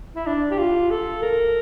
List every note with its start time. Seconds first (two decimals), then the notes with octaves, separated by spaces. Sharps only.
0.15 E4
0.26 D4
0.51 G4
0.58 F4
0.91 A4
1.22 A#4